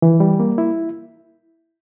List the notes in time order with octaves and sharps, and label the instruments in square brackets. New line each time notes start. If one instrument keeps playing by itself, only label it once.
[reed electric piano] E3
G3
A#3
E4